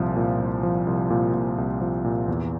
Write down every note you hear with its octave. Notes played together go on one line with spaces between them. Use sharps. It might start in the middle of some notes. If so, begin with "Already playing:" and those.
Already playing: C2 A#2 F3
A#2
C2
F3
C2
A#2
A#2
C2
F3
A#2
E2